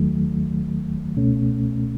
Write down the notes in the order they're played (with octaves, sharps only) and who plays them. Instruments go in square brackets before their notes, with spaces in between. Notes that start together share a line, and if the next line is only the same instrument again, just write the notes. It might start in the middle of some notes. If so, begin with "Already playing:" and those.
Already playing: [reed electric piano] D#2 D#3 F#3 A3
C#2 B2 A3 C#4